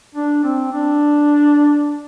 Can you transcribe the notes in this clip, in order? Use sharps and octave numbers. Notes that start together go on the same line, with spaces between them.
D4
C4
D4